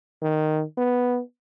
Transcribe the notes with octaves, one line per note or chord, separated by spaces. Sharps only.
D#3
B3